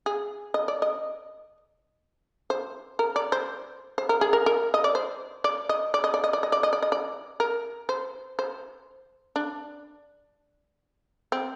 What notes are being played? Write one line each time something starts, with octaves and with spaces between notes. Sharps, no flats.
G#4
D#5
D5
D#5
C5
A#4
D5
C5
C5
A#4
G#4
A#4
A#4
D#5
D5
C5
D5
D#5
D5
D#5
D5
D#5
D5
D#5
D5
D#5
D5
D#5
D5
A#4
C5
C5
D4
C4